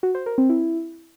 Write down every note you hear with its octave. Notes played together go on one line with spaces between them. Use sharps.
F#4
C5
A#4
C4
E4